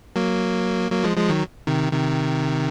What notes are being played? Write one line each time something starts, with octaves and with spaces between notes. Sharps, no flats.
F#3 A#3
F#3 A#3
F3 G#3
F3 G#3
D#3 F#3
C3 D#3
C3 D#3